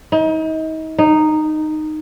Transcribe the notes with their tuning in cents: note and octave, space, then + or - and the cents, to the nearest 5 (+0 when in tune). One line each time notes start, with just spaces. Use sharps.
D#4 +35
D#4 -10